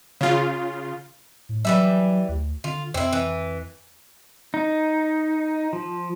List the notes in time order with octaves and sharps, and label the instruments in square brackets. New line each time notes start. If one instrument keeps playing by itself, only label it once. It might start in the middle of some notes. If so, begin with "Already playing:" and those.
[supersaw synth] C#3 F4
[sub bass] A2
[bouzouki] E3 G3 E5 [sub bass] F#3
[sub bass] D2
[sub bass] D3 [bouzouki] F4
[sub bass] F2 [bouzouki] C4 E4
[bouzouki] E3
[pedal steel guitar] D#4
F3